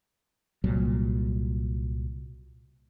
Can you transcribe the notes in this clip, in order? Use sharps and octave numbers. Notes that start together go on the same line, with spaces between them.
C2 A#2 F#3 G3